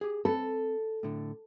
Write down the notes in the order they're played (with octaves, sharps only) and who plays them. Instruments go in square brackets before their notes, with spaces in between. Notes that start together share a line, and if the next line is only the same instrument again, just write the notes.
[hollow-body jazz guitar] G4 G#4
[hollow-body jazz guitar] C4 B5 [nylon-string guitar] A4
[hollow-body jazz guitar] A2 D3